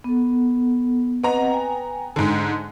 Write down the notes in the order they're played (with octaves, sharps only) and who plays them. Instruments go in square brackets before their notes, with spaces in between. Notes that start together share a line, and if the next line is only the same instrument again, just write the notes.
[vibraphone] B3 A4
[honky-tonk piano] B3 A#5 [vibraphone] C4 D#5 F#5
[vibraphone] G5 G#5
[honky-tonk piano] G#2 D3